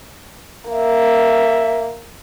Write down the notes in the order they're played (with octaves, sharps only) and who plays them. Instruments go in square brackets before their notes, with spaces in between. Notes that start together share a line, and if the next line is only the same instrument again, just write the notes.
[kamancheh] A#3 [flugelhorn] E5